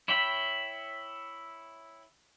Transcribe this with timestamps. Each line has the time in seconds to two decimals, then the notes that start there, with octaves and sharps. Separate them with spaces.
0.08 E4 C#5 E5 G5 B5